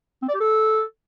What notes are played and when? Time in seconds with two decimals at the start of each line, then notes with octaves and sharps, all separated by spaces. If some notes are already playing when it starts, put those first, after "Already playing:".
0.22 C4
0.28 D5
0.34 G4
0.40 A4